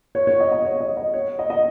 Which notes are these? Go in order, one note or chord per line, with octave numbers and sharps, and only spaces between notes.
C#5
C#5
D#5
D#5
C#5
D#5
D#5
C#5
D#5
D#5